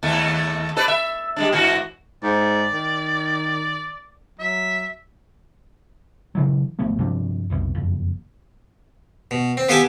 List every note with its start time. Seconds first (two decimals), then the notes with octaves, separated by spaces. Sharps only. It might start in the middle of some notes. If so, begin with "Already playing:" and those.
0.03 D#2 A3
0.76 A4 B4 D5
0.88 E5
1.36 G3 G#3 D4
1.53 G#2 E3 F#4
2.23 G#2 D5
2.72 D#3
4.39 F#3 E5
6.35 C#3 E3 F#3
6.79 G#1 F3 A3 B3
6.99 G2 C3 F3 D4
7.50 F1 B1 B2
7.75 F#1 F2
9.31 B2
9.57 C4
9.69 B3 F4 G4 A4 G#5 A5